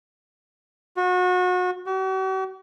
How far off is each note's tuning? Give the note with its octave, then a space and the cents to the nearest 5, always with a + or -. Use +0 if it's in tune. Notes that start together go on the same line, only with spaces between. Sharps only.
F#4 -30
F#4 +45